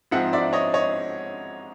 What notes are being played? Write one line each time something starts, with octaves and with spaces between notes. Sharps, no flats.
G#2 F3 G#3 C4 E5 F#5
D5 E5
C#5 D#5
C#5 D#5